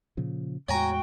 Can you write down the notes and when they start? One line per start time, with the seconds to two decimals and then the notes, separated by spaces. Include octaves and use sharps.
0.17 A#2 C#3 F3
0.69 E2 A2 G#3 F#4 C#5 G5 G#5 A#5